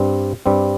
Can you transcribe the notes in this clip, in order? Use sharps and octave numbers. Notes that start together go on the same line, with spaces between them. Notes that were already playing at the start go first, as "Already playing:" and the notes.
Already playing: G2 G3 C4
G2 G3 C4